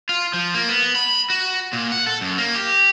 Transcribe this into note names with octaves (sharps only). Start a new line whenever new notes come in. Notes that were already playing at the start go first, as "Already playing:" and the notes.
F4
F3
A#3
B3
B5
F#4
A#2
F#5
A4
F#2
A#3
G4